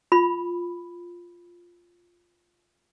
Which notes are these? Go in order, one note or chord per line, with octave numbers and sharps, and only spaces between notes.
F4 B5